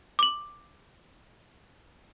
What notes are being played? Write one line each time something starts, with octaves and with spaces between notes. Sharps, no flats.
D6 F#7